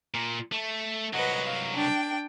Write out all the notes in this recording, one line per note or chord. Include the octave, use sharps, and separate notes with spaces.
A#2
A3
C2 F#3 B4 D#5 F#5
F5
D4 G5